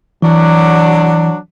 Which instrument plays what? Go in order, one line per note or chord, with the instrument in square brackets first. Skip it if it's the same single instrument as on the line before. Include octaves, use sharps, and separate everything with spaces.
[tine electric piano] E3 [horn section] F#3 D4